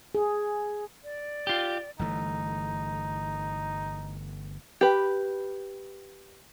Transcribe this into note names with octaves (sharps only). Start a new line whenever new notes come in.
G#4
D5
F4 G4
G1 E3 A3 D#4
G4 B4